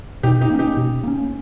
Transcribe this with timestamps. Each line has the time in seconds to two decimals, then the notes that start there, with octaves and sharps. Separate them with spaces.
0.23 B2 D#4 G4
0.41 D#4 G4
0.50 A#3 C#4
0.59 D#4 G4
0.77 B2
1.04 A#3 C#4